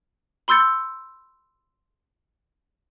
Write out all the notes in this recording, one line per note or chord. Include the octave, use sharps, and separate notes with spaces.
B5 C6 E6 G6 A6 C#7